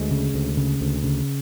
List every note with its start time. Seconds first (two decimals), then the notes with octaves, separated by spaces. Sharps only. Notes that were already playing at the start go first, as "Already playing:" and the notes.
Already playing: D2 G#3
0.11 C#3
0.34 D2
0.57 C#3
0.81 D2
1.04 C#3